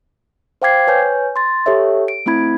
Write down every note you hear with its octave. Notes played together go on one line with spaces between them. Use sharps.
C5 F5 G5 D6 G#6 C7
B4 C#5 G#5 G6
C6 A6
G4 A4 C#5 E5
D7
A3 C4 E4 B5 G#6